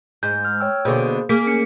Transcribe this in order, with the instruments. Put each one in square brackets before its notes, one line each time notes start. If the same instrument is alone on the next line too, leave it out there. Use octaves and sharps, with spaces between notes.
[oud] G#2 [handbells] G6
[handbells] F6
C#5 G5 E6
[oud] B2 D3 [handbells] A#3 G#4 C5
[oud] A#3 G#4 [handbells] B6
[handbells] C#4 C#7